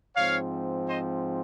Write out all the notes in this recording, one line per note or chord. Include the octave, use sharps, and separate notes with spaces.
G#2 F3 C4 C#5 F5
C5 D#5